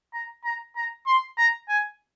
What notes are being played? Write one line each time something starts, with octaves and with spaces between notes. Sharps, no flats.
A#5
A#5
A#5
C6
A#5
G#5